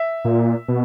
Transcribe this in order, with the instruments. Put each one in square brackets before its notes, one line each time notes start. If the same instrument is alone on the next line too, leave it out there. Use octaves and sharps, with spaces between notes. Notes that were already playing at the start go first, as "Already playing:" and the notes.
Already playing: [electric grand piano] E5
[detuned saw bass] A#2
B2